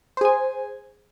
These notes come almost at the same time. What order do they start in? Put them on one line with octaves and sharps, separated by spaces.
C5 G#4 G#5